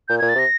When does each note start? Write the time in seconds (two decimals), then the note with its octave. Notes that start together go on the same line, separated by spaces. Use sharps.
0.08 A#2 G6
0.19 G#6
0.22 A#2
0.29 A6
0.35 C3 A#6